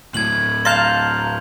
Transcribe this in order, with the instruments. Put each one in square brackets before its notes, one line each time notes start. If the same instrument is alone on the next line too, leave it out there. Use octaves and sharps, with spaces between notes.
[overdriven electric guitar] D2 A2 [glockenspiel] G#6 F#7
[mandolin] F5 A5 A#5 [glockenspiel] C6 G6 F7